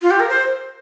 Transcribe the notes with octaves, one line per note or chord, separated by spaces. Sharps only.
F4
G4
A#4
C5